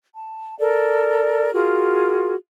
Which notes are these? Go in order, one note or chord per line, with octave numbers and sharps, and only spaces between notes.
A5
A4 A#4 D5
F4 F#4 G#4 A#4